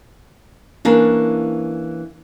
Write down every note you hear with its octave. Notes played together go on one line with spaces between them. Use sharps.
E3 A#3 C#4 D4